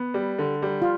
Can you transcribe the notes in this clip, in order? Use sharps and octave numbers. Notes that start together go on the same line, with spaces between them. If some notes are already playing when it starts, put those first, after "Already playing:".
Already playing: B3
G3
D3
G3
F4